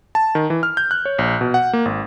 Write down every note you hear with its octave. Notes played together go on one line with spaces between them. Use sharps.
A5
D#3
E3
F6
G6
F#6
C#5
A#1
B2
F#5
A#3
G#1